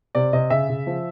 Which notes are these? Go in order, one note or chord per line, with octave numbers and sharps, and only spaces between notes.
C3 D5
C3 D#5
C#3 E5
C#3
F3